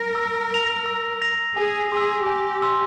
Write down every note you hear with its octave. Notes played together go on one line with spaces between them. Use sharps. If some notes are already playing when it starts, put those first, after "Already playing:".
Already playing: A#4
E6
A#6 F7
E6
A#6 F7
G#4 G#5
G#4 C6
E6
G4 G#5
C6 E6